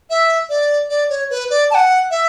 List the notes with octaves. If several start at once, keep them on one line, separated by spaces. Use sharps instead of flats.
E5
D5
D5
C#5
B4
D5
A5
F#5
E5